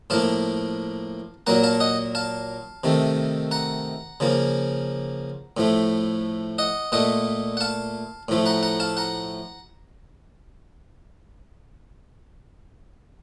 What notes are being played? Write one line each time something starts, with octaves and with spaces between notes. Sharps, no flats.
A2 F3 A#3 F5 A5
A#2 F#3 A#3 F#5 A#5
F5 A5
D#5 F#5
F5 A5
C3 D#3 A3
F#5 A#5
C#3 F3 A#3
A2 F3 A3
D#5 F#5
A#2 A3 D#5 F#5
F#5
F5 A5
A2 F3 A3
F#5 A#5
F#5 A#5
F5 A5
F#5 A#5